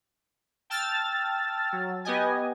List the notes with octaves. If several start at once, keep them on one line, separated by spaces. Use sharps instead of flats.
G5 A5 E6 F6 A6
F#3
B3 G4 D#5 G#5